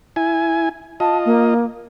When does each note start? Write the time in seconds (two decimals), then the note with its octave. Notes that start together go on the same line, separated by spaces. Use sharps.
0.16 E4 G#5
1.00 F4 D#5 A5
1.25 A#3